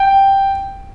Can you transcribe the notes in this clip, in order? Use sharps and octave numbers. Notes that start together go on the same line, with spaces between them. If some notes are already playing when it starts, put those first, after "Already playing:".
Already playing: G5